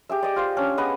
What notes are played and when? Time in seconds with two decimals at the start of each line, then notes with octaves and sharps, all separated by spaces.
0.09 G4 G#4 E5
0.23 D5 D#5
0.36 F4 C5
0.57 C#4 D4
0.78 B3 G#4 B4 D#5